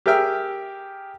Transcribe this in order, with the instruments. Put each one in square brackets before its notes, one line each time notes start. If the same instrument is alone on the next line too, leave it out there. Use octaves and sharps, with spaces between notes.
[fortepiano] G4 G#4 A#4 E5 G5 F6